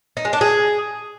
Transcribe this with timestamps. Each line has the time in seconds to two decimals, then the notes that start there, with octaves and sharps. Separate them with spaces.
0.17 D#4
0.25 G#3
0.33 D4
0.41 G#4